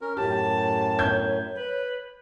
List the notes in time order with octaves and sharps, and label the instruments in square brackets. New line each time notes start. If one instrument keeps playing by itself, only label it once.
[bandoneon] C#4 A#4
[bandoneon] F#2 A2 [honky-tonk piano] G4 [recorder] A5
[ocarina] C#5 [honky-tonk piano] G6 G#6
[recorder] B4